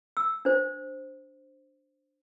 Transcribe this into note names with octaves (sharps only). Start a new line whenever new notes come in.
E6
D4 C5